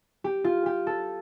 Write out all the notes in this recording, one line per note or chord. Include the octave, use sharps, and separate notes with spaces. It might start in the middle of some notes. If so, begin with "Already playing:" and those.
G4
F4
G4
A4